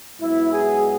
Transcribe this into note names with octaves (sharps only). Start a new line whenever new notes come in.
G#2 F#3 B3 E4
G#4